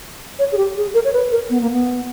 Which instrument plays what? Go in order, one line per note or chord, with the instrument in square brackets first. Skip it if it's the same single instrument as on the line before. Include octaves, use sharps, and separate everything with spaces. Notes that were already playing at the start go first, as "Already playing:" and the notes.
[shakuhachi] C#5
G#4
G4
G#4
A#4
C#5
B4
A#4
B3
A#3
B3